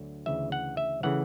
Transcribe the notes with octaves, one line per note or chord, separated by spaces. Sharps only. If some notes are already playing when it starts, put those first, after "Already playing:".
Already playing: D2 D3 F#3
D2 C#3 E3 E5
F#5
E5
C#3 E3 A3 F#5